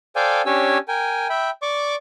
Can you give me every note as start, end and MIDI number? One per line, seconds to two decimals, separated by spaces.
0.16 0.42 69
0.16 0.42 72
0.16 0.42 74
0.16 0.42 77
0.16 0.42 79
0.16 0.42 80
0.46 0.78 61
0.46 0.78 62
0.46 0.78 67
0.46 0.78 73
0.46 0.78 80
0.46 0.78 88
0.88 1.27 70
0.88 1.27 79
0.88 1.27 80
1.30 1.50 76
1.30 1.50 79
1.30 1.50 83
1.62 1.96 74
1.62 1.96 85
1.62 1.96 86